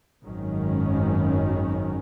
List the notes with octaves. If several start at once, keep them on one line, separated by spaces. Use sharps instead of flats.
G#1 F#2 D#3 F#3 C#4